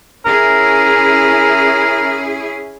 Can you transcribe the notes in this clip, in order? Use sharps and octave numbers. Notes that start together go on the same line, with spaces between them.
C#4 E4 G#4 A#4